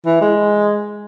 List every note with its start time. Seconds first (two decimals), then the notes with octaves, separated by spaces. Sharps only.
0.06 E3
0.21 G#3